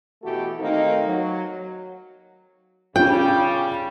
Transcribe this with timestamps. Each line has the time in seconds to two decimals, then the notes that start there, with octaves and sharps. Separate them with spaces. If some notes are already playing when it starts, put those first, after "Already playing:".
0.24 B2 E3 A3 F#4 G4 A4
0.59 D#3 A3 A#3 C4 D#4
1.07 F#3
2.96 C#3 G3 C#4 F4 G5